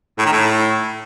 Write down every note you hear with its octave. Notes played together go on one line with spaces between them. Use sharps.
A2
D#3
A2